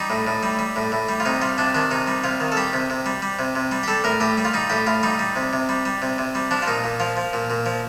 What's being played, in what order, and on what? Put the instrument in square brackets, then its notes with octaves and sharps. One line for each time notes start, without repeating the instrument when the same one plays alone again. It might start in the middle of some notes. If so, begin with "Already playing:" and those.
Already playing: [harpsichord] G3 D#4
A2
A2
G3
G3
A2
A2
G3
F4
C3 D#4
G3 F4
C3 D4
D#3 D4
C3 D#4
G3
C3 F4
D#3
A4
G3 G4
C3
C3
G3
G3
C3
C3
G3
G4
G3 A4
A2 A#4
A2 G4
G3
F4
G3 D#4
A2 G4
A2 F4
G3 D#4
G3
C3
C3
G3
G3
C3
C3
G3
F3 D4
F4
A#2 D#4
A#2
F3 F4
F3
A#2
A#2
F3